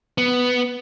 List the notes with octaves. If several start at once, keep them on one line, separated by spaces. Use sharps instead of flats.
B3